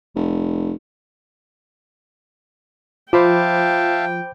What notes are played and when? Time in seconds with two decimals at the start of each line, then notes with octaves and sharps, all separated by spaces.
0.16 F1
3.13 F3 C5 E5 F5 G5 A5 B5 D6